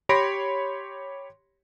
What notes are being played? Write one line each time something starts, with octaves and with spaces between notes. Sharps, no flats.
G4 C#5 B5 C6 A#6 D7